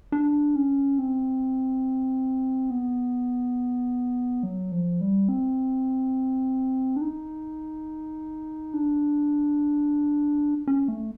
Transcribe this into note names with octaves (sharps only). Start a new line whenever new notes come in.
D4
C#4
C4
B3
F#3
F3
G3
C4
D4
D#4
D4
C#4
A3